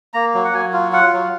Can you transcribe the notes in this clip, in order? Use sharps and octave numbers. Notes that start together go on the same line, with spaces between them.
A#3 A#5
F#3
F#5
F#3 G#5
F4
F4 F#5
F#3